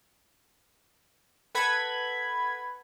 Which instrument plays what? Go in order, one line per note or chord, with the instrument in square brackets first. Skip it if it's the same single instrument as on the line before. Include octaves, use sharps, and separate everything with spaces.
[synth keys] A4 B4 F#5 B5 G#6